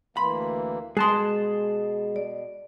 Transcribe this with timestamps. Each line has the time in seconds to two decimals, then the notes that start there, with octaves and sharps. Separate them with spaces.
0.17 D2 E3 A#3 B5 C6
0.97 B2 G#3 G#4 A5 C6 D#6 F#6
2.16 D5